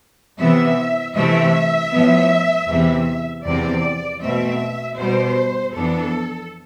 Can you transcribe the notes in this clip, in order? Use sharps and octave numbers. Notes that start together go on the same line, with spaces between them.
C3 E3 B3 E5
C3 E3 A3 C4 E5
A2 F3 B3
E2 C3 E3
E2 C3 F3 C4 D5
B2 A3 C4 E5
B2 G3 B3 C5
F2 E3 B3 D4 A4